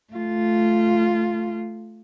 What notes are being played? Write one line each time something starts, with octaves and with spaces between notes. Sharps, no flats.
A3 F4